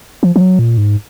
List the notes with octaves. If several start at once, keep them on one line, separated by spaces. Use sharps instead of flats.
F3
F3
F#3
A#2
G#2